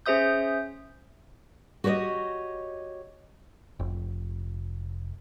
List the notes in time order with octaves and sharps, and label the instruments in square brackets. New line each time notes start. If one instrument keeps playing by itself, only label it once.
[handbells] C#4 G#4 C5 E5 D#6 G6
[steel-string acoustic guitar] F#4 G4 C5 C#5 D#5
[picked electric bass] F1